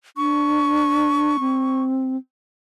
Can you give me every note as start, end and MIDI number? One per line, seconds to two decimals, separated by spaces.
0.17 1.37 62
0.17 1.82 85
1.40 2.17 60